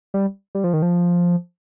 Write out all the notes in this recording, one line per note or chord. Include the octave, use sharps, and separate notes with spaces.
G3
G3
F3
D#3
F3